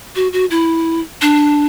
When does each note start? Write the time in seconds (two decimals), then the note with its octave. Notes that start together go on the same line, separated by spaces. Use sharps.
0.16 F#4
0.33 F#4
0.51 E4
1.22 D4